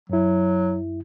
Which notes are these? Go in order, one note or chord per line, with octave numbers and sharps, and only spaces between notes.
F#2 F#3 E4